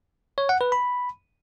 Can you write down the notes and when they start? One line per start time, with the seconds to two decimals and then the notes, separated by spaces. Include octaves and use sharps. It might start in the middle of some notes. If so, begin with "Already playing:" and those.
0.38 C#5
0.49 F#5
0.61 B4
0.72 B5